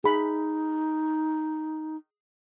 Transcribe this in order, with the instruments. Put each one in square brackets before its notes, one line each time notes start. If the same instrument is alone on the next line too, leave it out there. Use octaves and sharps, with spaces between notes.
[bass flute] D#4 [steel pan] G#4 B5